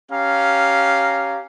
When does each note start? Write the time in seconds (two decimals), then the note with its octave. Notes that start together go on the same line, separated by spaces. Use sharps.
0.11 C#4 G4 F5 A#5